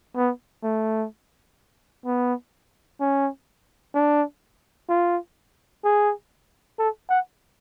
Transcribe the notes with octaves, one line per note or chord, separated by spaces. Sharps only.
B3
A3
B3
C#4
D4
F4
G#4
A4
F#5